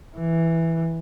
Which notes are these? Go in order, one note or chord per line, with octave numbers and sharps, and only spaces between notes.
E3